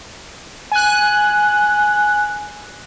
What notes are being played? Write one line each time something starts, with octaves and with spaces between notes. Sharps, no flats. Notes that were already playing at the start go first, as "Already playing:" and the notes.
G#5 F#6